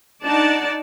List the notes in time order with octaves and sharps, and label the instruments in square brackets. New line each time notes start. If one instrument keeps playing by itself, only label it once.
[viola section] D4 D#4 D5 F#5 A5